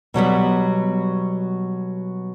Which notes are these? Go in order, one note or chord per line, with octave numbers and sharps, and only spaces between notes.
B2 F#3 G3 B3